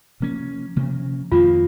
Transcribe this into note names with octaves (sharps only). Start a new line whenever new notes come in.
C3 F3 A#3 C#4
C3 F3 A#3 C#4
F2 D#3 A#3 F4